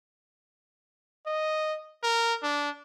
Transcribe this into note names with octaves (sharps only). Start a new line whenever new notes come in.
D#5
A#4
D4